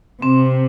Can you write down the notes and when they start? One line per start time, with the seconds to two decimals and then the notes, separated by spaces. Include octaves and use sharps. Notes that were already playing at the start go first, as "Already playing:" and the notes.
0.22 C3 C4